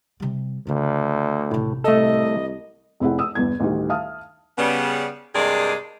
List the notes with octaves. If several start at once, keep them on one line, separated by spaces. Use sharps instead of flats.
C3 G3
D2 C#3 E4
A1 A2 C3
C2 A3 A4 D#5
F1 C4 E4 G#4 F#5
D#6 E6
G1 E2 G#6
A1 D2 D#3 G3
E5 F5 A5 D#6 F6
C#3 G3 B3
G2 C3 G#3 A#3 G#4 D5